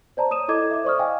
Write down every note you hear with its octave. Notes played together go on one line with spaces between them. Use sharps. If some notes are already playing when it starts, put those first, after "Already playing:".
C5 D5 A5 A#5
C#5 D#6 D#7 E7
E4 A4 D#5 D6 G#6
E5 D6
C5 D5 C#6 D#6 F6
D#5 F5 G5 G#5